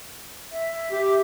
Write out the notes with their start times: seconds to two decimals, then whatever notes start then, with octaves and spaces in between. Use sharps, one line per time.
0.52 E5
0.92 G4